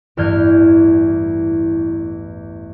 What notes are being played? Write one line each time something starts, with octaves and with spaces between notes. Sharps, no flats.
A1 E2 G2 F6 G6 G#6